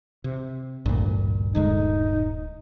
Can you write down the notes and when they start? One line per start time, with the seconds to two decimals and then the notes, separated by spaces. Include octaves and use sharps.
0.24 C3
0.86 A1 D2 G2 A#2
1.55 D1 D3 G#3 D#4